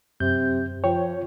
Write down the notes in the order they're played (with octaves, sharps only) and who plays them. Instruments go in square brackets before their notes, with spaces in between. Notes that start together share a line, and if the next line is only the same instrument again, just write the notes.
[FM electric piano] F#2 [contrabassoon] C3 [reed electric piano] G6
[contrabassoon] F3 [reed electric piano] C#5 [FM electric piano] G5